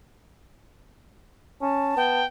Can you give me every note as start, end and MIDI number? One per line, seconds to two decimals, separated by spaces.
1.62 1.95 61
1.62 2.23 81
1.97 2.23 59
1.97 2.26 79